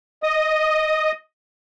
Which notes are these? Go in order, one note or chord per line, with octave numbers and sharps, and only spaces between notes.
D#5 D#6